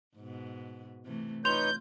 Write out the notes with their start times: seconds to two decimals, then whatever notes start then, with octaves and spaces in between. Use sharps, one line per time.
0.16 G#2 B2
1.05 C3 E3 A3
1.45 D#4 F4 B4 C#5 C6 G6 F7